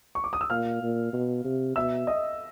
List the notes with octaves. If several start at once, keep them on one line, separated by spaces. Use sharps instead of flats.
C#6
D6
D#6
E6
A#2 F5 F6
A#2
B2
C3
B2 E5 E6
D#5 D#6